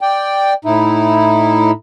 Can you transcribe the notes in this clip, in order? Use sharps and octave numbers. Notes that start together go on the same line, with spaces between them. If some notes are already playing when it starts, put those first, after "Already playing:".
D5 G5
A2 D#4 E4